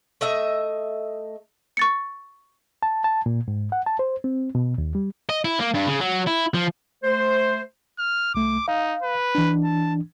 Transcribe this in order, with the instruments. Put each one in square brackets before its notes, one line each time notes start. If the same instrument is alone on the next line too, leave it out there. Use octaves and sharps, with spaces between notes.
[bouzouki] A3 D#5 E5
[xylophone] C#6 A6 C#7
[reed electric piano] A5
A5
A#2
G#2
F#5
A5
C5
C4
B2
D#2
G3
[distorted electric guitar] D#5
E4
A#3
G2
C#3
F#3
E4
F3
[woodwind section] A3 C5
[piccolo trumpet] F6
[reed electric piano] C2 A3 [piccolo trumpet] D6
[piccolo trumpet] D#4 [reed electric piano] F5
[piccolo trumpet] B4
[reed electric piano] E3 D4
[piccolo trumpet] A5